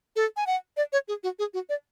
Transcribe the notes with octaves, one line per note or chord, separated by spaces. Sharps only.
A4
G#5
F#5
D5
C#5
G#4
F#4
G#4
F#4
D5